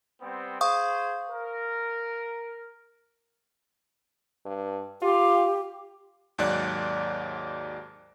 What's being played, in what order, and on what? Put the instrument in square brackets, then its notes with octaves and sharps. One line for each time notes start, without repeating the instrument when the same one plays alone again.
[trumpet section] G3 B3 C4
[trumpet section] G#4 C5 [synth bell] F5 C#6 D#6
[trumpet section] A#4
[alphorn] G2
[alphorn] F4 [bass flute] G4
[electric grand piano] D#2 G#2 F#3 D5 F#6